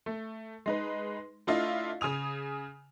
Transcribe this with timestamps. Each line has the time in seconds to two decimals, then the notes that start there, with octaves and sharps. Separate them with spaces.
0.06 A3
0.66 G#3 D#4 B4
1.47 A3 D4 E4 F4 D#5 F5
2.01 C#3 G#5 D#6 F7